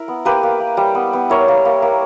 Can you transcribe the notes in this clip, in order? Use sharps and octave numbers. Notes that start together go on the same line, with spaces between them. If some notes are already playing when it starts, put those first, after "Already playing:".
Already playing: E4 A#4
B3
A#3 G4 B4
A#3
A#3
G3
B3
B3
E4 A#4 C#5
A#3
A#3
A#3